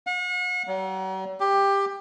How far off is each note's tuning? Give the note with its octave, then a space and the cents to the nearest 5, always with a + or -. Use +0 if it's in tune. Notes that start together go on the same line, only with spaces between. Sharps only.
F#5 -40
F#3 +45
G4 +15